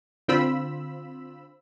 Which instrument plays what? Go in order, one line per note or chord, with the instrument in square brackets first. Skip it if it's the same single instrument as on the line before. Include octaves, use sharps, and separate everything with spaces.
[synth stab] D3 C4 F4 B5 E6